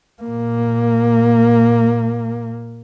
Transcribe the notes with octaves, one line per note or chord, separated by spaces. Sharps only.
A#2 A#3